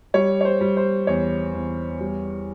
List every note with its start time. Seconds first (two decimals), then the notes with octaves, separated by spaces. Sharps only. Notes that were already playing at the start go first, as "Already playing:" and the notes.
0.14 G3 C#5
0.41 C#5
0.45 C5
0.61 G3
0.77 C5
1.07 E2 C#5
1.54 E2
2.00 G3